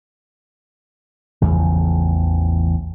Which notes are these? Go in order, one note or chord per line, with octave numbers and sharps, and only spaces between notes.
A1 E2 C#3 F3